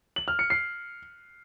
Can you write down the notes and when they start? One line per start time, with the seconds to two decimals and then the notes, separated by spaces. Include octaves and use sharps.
0.16 F#7
0.28 F6
0.39 C#7
0.50 C7